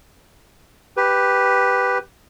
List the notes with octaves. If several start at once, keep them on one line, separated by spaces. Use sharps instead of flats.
G4 B4